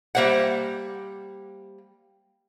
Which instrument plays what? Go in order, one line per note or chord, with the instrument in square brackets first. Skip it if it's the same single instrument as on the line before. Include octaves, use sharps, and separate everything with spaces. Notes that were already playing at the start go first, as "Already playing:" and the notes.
[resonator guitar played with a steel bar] G3 A#3 C5 E5 F#5